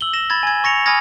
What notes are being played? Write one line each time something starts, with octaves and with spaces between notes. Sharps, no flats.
E6 F#7 G7
A#6 E7
B5 G#6 A6
G#5 G#6
C#6 A#6 C#7 F7
G#5 B5 D#6 F6 G#6 A#6